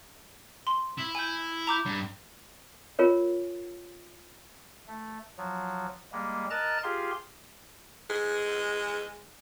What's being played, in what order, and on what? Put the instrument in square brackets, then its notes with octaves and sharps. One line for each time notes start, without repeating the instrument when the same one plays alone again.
[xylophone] C6
[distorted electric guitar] E4
[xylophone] G#5 G6
A#5 D6 G6
[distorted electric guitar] G2
[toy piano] F4 A#4 C#5
[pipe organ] A3
F3 F#3
G3 G#3 A#3
A#4 D#5 A5 A#5 F#6 A6
F4 G4 G#4 F5 C6
[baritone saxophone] G#3